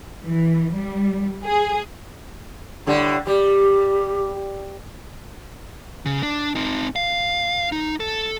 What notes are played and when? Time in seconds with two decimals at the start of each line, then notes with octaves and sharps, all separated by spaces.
0.25 E3
0.74 G3
1.44 G#4
2.87 A2 D3 G3
3.27 G3 G4
6.06 C#3
6.23 D4
6.56 C4 D#4
6.96 F5
7.72 D#4
8.00 A4